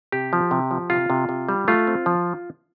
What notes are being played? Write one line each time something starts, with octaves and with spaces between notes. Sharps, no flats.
C3 G4
F3
C3
F3
C3 F4
C3
C3
G3
A3 F4
C4
F3